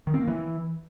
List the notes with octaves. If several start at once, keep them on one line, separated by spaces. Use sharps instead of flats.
D#3
C4
A#3
E3